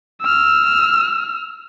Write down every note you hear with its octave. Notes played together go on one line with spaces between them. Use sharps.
E6 F6